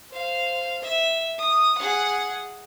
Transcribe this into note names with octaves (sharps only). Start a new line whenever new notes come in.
C5 F5
E5
D#6
G#4 F#5